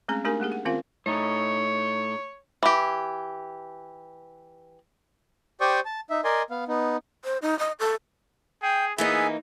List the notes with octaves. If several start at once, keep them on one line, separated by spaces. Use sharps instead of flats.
G#3 A3 C4 C#4 G#4 A#5
A3 D4 D#4 G4 A#4 G#5
G#3 A#3 G4 G#4
F#5
D#3 C4 C#4 F4 A#4 F5
A2 A3 D#4 C#5
E3 G4
G4 C5 D5 G5 C#6 D#6
A5
D#4 E5
A#4 D5 D#5 G#5 C6
B3 F5
B3 D#4
C5
D#4
D#5
A4
G#4 G5
E3 A#3 B3 D#4 G#4 E5 G#5